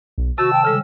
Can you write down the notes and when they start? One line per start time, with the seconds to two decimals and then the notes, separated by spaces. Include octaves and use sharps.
0.18 B1
0.38 C3 D#3 F#4 A5 E6
0.53 G5
0.65 C#3 G3 G#3 A4